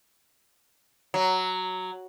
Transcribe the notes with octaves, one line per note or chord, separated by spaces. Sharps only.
F#3